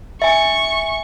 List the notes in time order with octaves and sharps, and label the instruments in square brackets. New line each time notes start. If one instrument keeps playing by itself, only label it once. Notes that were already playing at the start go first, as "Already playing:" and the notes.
[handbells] E5 G#5 [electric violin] C#6